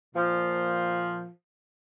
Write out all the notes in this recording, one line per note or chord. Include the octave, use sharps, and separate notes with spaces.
A#2 F3